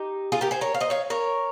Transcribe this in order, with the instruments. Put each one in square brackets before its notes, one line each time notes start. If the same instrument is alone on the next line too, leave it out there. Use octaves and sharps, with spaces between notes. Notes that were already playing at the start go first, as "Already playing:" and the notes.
Already playing: [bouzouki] D#4 G4
F4 G#4
G4 A#4
G#4 C5
A#4 C#5
F5
C5 D#5
C#5 F5
A#4 C#5